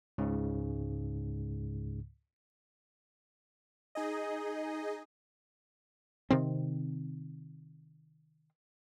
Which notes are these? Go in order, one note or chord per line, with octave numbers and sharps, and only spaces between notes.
C#2 G#2 C#3
D#4 G#4 D#5
C3 D#3 C4